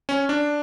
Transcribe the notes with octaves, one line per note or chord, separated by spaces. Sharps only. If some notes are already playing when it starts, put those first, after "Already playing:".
C#4
D4